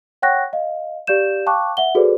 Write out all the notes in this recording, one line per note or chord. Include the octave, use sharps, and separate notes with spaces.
C#5 F#5 G5 C#6 F#6 A#6
D#5 F5
G4 D5 F5 G6 E7
F5 G5 A5 C#6 D6 F#6
E5 F#5 G7
F#4 G#4 A4 B4 C5 D5